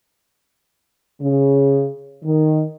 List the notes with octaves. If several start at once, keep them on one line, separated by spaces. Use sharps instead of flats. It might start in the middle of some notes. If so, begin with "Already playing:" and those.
C#3
D#3